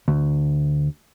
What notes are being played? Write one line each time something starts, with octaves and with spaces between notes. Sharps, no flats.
D2